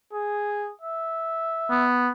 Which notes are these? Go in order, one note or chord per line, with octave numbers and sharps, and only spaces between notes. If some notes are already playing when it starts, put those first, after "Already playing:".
G#4
E5
B3